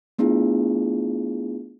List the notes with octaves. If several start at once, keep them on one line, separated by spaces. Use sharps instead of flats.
A3 B3 D4 E4 F4 G#4